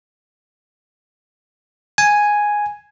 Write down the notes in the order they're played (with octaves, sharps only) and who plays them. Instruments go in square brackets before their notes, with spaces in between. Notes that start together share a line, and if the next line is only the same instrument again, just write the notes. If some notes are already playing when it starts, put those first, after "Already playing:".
[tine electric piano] G#5